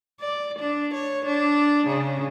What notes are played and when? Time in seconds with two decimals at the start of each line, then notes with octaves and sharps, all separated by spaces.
0.20 D5
0.59 D4
0.94 C#5
1.26 D4
1.87 C#3